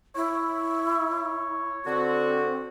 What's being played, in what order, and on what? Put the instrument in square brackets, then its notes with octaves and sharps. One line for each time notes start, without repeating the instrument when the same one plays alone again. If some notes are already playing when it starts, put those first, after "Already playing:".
[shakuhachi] E4 [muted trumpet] C#5
[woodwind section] D3 F#4 [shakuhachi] C4